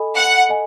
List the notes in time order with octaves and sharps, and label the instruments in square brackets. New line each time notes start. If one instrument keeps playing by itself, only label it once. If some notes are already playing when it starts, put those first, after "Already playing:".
Already playing: [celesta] A4 D#5 G#5 B5
[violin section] F#5
[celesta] A4 D#5 G#5